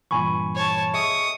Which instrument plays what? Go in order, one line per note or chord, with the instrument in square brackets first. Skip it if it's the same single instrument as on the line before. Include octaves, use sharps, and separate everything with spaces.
[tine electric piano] G2 A#2 E3 [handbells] G#5 B5 C#6
[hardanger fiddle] C#5 A5
[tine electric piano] G#4 D#5 E5 [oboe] C#6 [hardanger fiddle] D#6